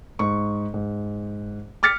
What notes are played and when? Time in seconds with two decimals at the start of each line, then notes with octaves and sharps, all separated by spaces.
0.19 G#2 C#6
0.74 G#2
1.83 D6 F6 A6 B6 C#7